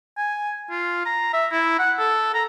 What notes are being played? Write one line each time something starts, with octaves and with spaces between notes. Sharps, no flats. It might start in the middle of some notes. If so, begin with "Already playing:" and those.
G#5
F4
A#5
E5
E4
F#5
A4
A#5